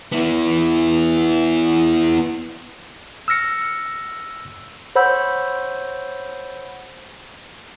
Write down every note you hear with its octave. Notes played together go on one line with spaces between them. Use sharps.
B3 E4
E6 F6 A#6 C#7
C5 C#5 F#5 B5 E6 G6